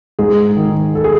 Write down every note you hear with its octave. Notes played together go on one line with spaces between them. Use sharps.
G#2 G#4
D#3
A4
G#4